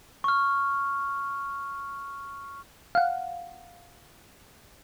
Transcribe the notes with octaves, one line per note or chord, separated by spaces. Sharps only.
C#6 F6
F5 F#5